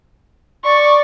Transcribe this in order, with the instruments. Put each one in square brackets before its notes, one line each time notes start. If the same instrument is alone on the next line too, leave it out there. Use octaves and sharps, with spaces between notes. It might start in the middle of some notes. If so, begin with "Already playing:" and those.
[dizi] D5 [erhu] C#6